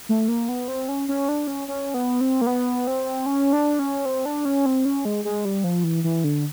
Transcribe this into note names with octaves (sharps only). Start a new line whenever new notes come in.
A3
A#3
B3
C4
C#4
C#4
D4
C#4
C#4
B3
C4
A#3
B3
C4
C#4
D4
C#4
C4
D4
C#4
C4
C#4
G#3
G#3
G3
F3
E3
E3
D3